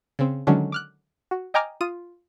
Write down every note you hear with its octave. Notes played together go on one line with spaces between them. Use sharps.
C#3 C4
D3 D#3 F#3 G#3 C#4 D4
D6 F6 F#6
F#4
D#5 G5 G#5 A#5 D6 F6
F4 D#6 D#7